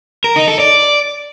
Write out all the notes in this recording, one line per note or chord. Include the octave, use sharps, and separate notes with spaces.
A#4
D#4
A4
D5